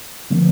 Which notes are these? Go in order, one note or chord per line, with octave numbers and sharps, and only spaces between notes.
D3 F3 A#3